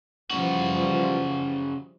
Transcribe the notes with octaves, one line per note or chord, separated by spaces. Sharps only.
C#3 E3 F3 G3 F#4